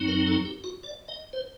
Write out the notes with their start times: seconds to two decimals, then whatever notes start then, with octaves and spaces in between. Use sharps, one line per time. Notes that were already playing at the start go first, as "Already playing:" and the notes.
Already playing: F#2 F#3 C4 D#4
0.08 A#4
0.27 A4
0.45 G4
0.64 F#4
0.83 D5
1.08 D#5
1.33 C5